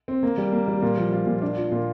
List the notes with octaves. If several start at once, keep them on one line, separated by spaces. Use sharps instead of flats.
C4
A#3
G3
A#3
G3
A#2
F3
F4
A#2
D4
F4
A#2